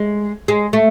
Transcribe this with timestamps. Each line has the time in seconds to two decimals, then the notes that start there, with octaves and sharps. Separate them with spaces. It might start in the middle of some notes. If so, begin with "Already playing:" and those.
Already playing: G#3
0.48 G#3
0.73 A3